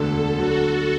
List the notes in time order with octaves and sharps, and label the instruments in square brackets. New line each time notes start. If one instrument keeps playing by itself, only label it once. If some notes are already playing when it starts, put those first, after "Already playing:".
Already playing: [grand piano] E1 D2 D3 [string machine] A4
[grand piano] D2 D3 F#3 [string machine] F#4